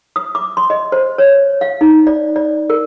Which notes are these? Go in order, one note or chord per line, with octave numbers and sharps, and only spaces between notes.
D#6
D6
C6
D#5
C5
C#5
F5
D#4
D5
D5
A#4